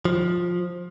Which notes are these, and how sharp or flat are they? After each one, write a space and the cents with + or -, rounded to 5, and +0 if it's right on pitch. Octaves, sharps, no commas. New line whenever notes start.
F3 +15